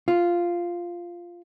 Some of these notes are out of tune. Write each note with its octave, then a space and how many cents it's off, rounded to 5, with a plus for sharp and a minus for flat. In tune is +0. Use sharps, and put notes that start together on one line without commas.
F4 -5